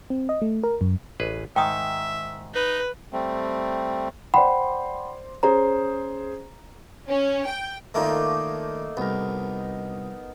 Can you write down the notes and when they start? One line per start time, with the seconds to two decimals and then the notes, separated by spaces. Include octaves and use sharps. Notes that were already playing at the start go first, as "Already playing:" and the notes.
0.10 C4
0.29 D#5
0.42 A3
0.63 A#4
0.81 F#2
1.20 A1 G#4 B4
1.56 G#2 D#3 E5 G5 D#6
2.54 D#4 B4
3.13 G3 A3 C4
4.34 C5 D5 F#5 G5 B5 C6
5.43 C#4 G#4 C5 A#5
7.08 C#4
7.47 G5
7.94 D#3 A3 A#3 D4 D#4 F4
8.97 C2 B3 A#4